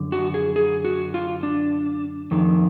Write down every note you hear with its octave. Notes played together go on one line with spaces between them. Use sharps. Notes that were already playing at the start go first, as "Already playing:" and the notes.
Already playing: F#2 D3
F#4
G#4
G#4
F#4
F4
D4
F2 D#3